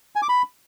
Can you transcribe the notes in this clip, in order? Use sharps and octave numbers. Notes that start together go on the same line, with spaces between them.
G#5
D6
B5